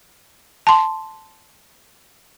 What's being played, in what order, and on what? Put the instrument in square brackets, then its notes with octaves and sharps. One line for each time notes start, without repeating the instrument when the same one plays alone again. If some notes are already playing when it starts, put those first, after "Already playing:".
[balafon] A5 C6